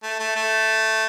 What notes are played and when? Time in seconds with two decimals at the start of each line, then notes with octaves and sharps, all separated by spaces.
0.03 A3
0.20 A3
0.36 A3